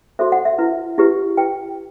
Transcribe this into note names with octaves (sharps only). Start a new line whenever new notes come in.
F#4 A4 C5 E5
F#5
E5
E4 B4
E4 G4 B4
E4 B4 G5